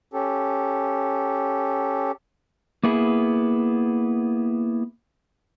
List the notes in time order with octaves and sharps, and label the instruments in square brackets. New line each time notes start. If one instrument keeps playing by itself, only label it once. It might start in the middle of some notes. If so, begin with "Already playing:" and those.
[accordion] C#4 G4 A4
[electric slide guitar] A#3 B3 E4 G#4